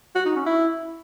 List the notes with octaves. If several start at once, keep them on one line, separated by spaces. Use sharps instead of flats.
F#4
D#4
C#4
E4